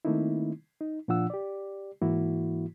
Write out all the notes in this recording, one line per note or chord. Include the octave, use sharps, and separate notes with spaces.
D#3 A3 A#3 C4 D#4 E4
D#4
A#2 F3 D4 F4 F#5 E6
G4 D5
G#2 E3 A#3 E4 F#4